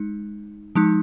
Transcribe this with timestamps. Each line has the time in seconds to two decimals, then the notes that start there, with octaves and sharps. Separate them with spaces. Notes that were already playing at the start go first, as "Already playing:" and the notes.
Already playing: G#3 D#4
0.75 F3 G#3 D#4